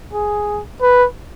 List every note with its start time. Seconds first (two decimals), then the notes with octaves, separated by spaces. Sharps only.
0.13 G#4
0.82 B4